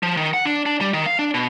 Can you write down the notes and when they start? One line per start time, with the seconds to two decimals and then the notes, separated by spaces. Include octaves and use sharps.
0.03 F3
0.17 D#3
0.34 F#5
0.45 D4
0.66 D4
0.81 G3
0.93 D#3
1.06 F5
1.19 D4
1.34 B2